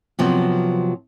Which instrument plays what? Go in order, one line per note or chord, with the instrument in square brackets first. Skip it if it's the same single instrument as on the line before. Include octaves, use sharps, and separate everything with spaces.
[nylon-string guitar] C3 F3 F#3 B3